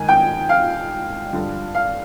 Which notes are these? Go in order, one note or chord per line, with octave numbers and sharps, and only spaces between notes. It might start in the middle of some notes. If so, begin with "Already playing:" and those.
Already playing: G#2 D#3 G#5
G5
F5
G2 D3 F3
F5